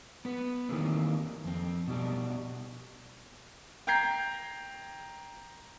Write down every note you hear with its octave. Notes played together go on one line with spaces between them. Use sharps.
B3 B4
D#3 E3 G3 A#3 C4
F2 C4
B2 G3 D4
G5 A#5 G6 G#6 C7